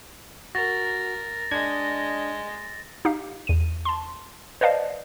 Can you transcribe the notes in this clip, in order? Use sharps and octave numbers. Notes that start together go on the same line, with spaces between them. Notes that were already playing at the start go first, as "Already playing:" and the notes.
F#4 A#4 A6 A#6
G#3 D4 D#5 G#6
D#4 G4 F5
E2 D#7
A5 C6
B4 C5 D5 D#5 F5 A5